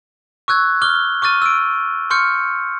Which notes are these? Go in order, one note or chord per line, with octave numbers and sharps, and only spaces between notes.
C#6 E6 F#6 G#6
D6 F6 G7
C#6 D6 F6 A6 D#7
E6 D7
C6 C#6 F6 G6 C#7